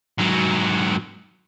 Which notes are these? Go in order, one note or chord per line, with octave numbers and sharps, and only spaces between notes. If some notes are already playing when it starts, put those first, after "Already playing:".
G#2 F#3